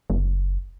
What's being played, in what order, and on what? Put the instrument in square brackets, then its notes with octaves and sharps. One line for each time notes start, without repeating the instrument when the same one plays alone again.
[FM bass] F#1